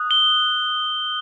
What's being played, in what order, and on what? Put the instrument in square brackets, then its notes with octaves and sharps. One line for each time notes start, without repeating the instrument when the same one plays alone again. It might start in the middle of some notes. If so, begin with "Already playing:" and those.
Already playing: [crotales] D#6 F#6
G7